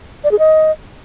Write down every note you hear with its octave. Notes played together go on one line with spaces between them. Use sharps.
D5
G#4
D#5